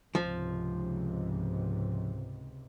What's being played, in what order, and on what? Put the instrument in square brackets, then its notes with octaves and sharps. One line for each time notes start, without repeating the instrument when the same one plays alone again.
[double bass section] C#2 G#2 C3 [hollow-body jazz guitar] F3